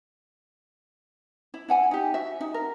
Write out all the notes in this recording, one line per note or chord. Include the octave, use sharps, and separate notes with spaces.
E4
E4 F#5 G#5
D#4 G4
F#4 E5
D#4
A#4